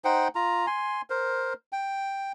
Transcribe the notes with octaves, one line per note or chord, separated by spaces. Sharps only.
D#4 C5 F#5 G5
F4 A#5
G#5 C6
A#4 C5
G5